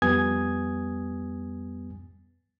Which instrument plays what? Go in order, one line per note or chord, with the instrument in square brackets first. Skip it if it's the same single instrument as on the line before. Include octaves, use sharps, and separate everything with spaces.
[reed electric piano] F2 G3 B3 G#5 D#6 G#6